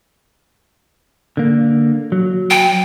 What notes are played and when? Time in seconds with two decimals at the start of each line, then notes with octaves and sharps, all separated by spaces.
1.37 D3 A#3
2.12 F#3
2.51 G5